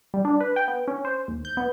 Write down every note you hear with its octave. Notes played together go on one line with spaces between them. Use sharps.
G3
D4
B4
G5
B3
C#4
C5
D#2
G6
B3